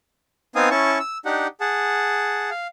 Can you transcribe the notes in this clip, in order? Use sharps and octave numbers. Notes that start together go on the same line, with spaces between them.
B3 C4 D#4 F5 G#5 D#6
C#4 E4 A5 C#6
E6
D4 D#4 G4 F#5
G#4 F#5 A5
F5